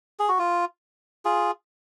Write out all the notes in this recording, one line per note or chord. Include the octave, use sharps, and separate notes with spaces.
G#4
F#4
F4
F4 G#4